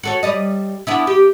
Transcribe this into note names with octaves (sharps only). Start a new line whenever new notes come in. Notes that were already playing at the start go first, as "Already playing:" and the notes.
F#4 A4 C#5
G3 D5 D#5
B3 D4 E4
G4